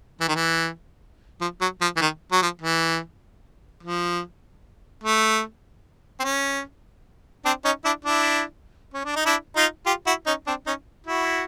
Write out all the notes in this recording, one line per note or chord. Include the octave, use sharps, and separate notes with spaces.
E3
D#3
E3
F3
F#3
F3
E3
D#3
F#3
F3
E3
F3
A3
C4
C#4
C4 D4
C#4 D#4
D4 E4
D4 E4
C#4
D4
D#4
D4 E4
D#4 F4
F4 G4
E4 F#4
C#4 D#4
C4 D4
C#4 D#4
E4 F#4